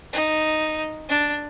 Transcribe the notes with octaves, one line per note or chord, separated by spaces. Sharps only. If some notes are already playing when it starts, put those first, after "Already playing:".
D#4
D4